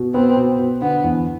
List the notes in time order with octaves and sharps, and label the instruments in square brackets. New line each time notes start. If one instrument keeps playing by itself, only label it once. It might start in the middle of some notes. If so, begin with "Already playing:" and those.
Already playing: [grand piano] B2
[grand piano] B3 [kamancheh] C4
[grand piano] B2
B2
[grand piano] D3 [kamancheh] B3
[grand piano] E2